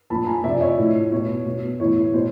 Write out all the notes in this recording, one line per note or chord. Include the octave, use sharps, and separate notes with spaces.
A#2 F3 A5 B5
G#5 A#5
C3 F3 D5 E5
C#5 D#5
A2 F3
B2 C#5
B2
A2 E3 C#5
B2 C5